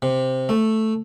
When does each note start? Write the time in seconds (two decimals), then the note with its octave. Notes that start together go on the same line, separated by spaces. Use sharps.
0.02 C3
0.49 A3